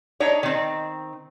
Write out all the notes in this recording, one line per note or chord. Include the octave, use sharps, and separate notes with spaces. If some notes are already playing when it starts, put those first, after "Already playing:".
D4 D#4 C#5
D#3 C4